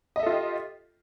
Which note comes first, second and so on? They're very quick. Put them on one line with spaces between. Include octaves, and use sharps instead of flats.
D#5 E5 A4 F4 G4